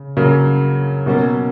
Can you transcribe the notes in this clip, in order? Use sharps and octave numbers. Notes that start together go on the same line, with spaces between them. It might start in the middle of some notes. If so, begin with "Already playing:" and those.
Already playing: C#3
C#3 F#3 A#3
B2 F#3 A#3 C#4